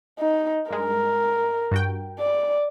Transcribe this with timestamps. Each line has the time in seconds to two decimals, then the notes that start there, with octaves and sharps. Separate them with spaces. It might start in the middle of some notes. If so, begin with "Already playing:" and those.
0.19 D#4
0.70 G2 G#3 A#4
1.71 G2 F#4 G5
2.19 D5